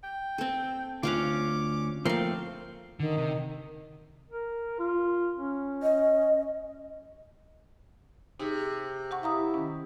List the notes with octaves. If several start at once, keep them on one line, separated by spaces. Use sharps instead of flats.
G5
C4 A4
D2 C#4 F4 F5 F#5 D6
F3 A3 A#3 C4 F5 C6
D3 D#3
C3
A#4
F4
C#4
D#5
C3 D#4 G#4
G4 F#5 C#6
E4 F5 A#5 D#6
D#3 C#4